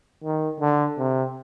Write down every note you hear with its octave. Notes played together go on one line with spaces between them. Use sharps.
D#3
D3
C3